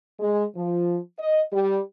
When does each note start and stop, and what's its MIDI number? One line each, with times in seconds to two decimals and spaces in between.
0.20 0.44 56
0.55 0.97 53
1.18 1.42 75
1.52 1.79 55